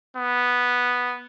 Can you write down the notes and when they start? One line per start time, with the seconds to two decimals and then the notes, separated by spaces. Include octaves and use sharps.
0.16 B3